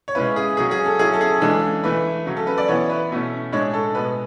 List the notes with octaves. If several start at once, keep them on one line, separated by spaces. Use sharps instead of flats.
C#5
C#3 G#3 C#4 E4 B4
G#4
C#3 F#3 C#4 G#4
G#4
A4
F#3 C#4 E4 G#4
A4
G#4
C#3 E3 G#3 D4 A4
E3 A3 E4 B4
C#3 F#3 C#4
A4
B4
D5
E3 B3 E4 C#5
B4
B2 A3 C#4 E4
A2 G#3 D4 C#5
A4
B2 G#3 B3 B4